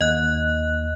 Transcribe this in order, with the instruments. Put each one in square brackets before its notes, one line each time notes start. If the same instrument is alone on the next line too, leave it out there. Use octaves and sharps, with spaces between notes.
[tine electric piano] D#2 [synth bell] D#5 F#6